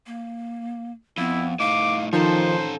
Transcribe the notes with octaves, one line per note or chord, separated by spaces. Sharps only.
A#3
F2 B3 E4
A2 D#4 F5 D6
D#3 F3 C#4 D#4 A4 C5